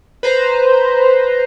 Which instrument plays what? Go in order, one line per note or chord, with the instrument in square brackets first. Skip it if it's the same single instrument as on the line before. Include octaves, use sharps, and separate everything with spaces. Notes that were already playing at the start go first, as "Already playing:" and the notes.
[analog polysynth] B4 C5 A#5